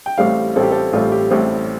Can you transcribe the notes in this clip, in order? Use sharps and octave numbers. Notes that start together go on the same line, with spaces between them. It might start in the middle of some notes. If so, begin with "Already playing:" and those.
G5
A1 A2 G3 C4 F5
A1 A2 G3 C4 A4
G4
A4
A1 A2 G3 C4 F4
G4
A1 A2 G3 C4